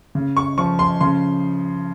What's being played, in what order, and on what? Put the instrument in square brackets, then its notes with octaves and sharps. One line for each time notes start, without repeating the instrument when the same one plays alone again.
[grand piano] C#3
C#6
F3 C#6
C6
C#3 C6